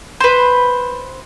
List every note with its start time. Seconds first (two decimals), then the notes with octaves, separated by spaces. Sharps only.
0.20 B4 C5